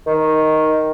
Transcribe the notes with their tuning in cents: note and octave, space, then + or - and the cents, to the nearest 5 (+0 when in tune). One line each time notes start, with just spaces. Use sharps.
D#3 +5